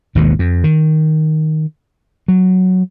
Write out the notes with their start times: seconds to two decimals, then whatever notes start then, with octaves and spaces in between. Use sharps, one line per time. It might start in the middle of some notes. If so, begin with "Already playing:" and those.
0.15 G#1 D#2 G#2 B2
0.39 F2
0.64 D#3
2.28 F#3